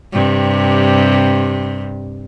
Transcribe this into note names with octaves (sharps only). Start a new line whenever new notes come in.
G2 C3